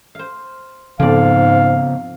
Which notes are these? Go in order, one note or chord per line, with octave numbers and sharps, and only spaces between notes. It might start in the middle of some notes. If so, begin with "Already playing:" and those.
C5 F5
F2 G#2 C#3 B3 D5 F5